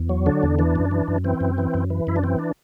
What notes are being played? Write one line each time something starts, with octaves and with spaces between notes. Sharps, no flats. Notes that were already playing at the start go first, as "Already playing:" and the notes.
Already playing: E2
F#3
D3 D4
E2
E3 D4
F#2
E3
F#2
E3 C4
F#2
E3
F#2
E3
F#2 E4
D4
E3 C4
D4